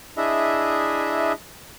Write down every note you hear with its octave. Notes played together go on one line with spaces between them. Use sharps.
D4 E4 G#4 D#5 E5